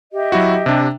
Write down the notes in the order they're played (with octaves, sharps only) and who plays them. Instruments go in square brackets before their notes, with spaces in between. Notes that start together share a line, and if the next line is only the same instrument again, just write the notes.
[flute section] G4 D#5 E5
[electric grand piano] F#3 E4 F#4
C3 D4